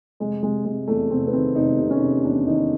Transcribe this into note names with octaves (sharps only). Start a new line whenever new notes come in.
F1 G#3
C3 G#3
C3 G#3
E2 A3
F1 C4
B3
D#3 C4
F1 D#4
C3
C#4
C3
E2 D4
D#3 D#4